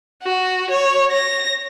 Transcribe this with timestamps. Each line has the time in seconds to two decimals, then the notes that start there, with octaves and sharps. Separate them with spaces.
0.23 F#4
0.71 C#5
1.12 A#6